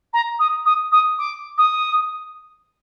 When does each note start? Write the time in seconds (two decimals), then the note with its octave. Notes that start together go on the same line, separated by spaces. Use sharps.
0.13 A#5
0.39 D#6
0.65 D#6
0.91 D#6
1.18 D6
1.57 D#6